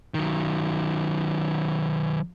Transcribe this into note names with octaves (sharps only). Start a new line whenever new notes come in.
D#3 F#3